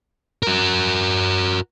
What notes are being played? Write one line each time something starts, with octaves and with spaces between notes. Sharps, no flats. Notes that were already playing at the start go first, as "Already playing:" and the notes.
F#4 A#4